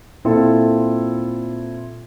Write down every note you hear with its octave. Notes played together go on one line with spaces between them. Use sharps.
A#2 C4 E4 F4 A4